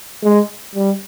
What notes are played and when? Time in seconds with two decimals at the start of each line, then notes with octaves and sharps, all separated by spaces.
0.24 G#3
0.75 G3